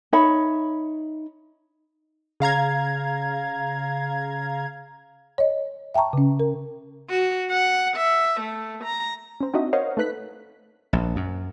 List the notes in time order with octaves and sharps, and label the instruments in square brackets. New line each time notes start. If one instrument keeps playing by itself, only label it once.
[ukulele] D#4 C#5 E5 B5
[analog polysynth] C#3 F5 A#5 G#6
[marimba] C#5 D#5
E5 G5 A5 A#5 C#6
C#3 C#4
A#4
[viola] F#4
F#5
E5
A3
A#5
[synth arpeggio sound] C4 C#4
C4 D4 D#4 F#4 D#5 E5
A#4 C5 C#5 D#5 F5 F#5
A3 D#4 B4 F#6 B6
[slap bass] A#1
F#2